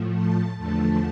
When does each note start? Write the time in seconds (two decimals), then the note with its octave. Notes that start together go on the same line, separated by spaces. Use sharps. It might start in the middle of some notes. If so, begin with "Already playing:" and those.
Already playing: A2 F3 A3
0.13 A5
0.57 E2 D3 F3 A3 A5